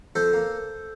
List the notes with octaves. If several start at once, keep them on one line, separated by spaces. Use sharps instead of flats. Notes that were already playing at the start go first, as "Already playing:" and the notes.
F2 A4 C5
A#3